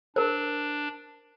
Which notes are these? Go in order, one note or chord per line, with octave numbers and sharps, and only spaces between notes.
D4 A#4 C5